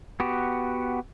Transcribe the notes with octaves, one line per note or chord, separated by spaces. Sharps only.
B3 F#4 G4